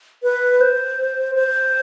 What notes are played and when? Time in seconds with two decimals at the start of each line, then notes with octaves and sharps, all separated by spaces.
0.23 B4
0.61 C5
1.35 C5